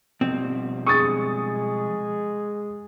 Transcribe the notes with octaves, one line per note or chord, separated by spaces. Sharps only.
B2 F3 G3 C4
G#3 G#4 C#6 D#6 A6